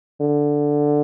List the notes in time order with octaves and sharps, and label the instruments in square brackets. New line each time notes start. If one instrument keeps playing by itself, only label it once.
[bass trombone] D3